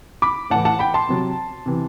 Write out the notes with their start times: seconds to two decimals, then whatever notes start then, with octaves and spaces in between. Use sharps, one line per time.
0.22 B5 D6
0.50 A2 E3 F#5 A5
0.65 F#5 A5
0.79 G5 B5
0.94 A5 C6
1.09 C3 F#3
1.66 C3 E3